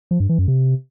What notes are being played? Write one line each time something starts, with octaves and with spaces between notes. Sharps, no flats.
F3
G2
E3
F#2
C3